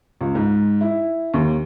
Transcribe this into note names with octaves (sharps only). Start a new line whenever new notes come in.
C#2
G#2
E4
D#2